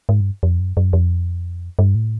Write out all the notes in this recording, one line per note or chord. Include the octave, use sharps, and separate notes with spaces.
G#2
G2
F2
F#2
F#2
F2
G2
A2